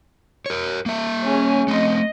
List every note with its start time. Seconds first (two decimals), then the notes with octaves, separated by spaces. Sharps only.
0.46 A#4 C#5
0.86 A#3 E5
1.25 C#4 G#4 G#5
1.68 A3 C4 D#5